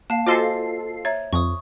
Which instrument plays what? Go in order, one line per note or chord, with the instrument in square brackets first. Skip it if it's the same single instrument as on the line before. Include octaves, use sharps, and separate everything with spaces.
[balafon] A#3 [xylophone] F5 A5
[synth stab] F4 A4 C7 [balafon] F#4 G#5 [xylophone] C5 D#5 C6
[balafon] C#5 E5 A#5 [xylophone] G#6
[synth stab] F2 [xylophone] C#6 D#6